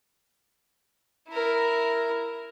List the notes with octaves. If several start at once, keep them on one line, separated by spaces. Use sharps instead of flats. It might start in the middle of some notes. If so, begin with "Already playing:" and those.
E4 A#4